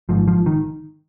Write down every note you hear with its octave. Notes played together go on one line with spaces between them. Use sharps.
G#1 G#2 F3
F3
D#3